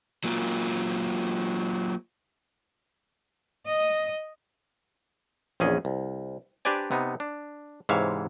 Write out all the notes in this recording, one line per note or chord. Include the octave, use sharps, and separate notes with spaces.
F#3 A#3 F4
D#5
A#1 E2 C#4 G#4 D#5
C2
D4 G4 B4 C5 D5 G#5
C3 B3 D#4
D4
G#2 C3 E3 C#5 E5 F5